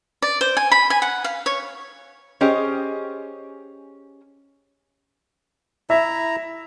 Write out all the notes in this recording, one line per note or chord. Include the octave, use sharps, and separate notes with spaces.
D5
C5
G#5
B5
G#5
F#5
F5
C#5
C#4 G4 G#4 C5 D#5
E4 E5 A#5